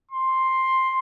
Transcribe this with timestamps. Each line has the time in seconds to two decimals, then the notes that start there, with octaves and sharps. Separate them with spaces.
0.11 C6